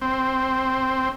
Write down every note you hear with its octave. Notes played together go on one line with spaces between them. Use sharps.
C4